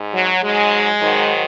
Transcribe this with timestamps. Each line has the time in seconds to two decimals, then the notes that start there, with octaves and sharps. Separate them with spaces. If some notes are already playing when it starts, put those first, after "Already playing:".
Already playing: G#2
0.14 F#3
0.43 G#2 F#3 G#3
1.01 G#2 D#3 F#3